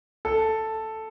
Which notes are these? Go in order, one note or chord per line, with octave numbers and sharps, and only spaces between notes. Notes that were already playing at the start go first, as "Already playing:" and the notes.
A4